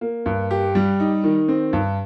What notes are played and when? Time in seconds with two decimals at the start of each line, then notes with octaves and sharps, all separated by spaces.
0.01 A#3
0.26 G2
0.51 G4
0.75 G3
1.00 D#4
1.24 D#3
1.48 C4
1.73 G2